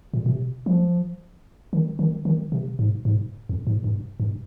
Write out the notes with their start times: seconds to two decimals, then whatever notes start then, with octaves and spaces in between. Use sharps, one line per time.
0.14 A#2
0.26 A#2
0.31 C3
0.66 F3
1.73 D#3
1.99 D#3
2.25 D#3
2.52 C3
2.79 G#2
3.05 G#2
3.49 F2
3.67 G#2
3.84 G2
4.20 G2